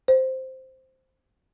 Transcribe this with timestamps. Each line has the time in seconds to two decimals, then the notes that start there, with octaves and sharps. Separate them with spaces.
0.08 C5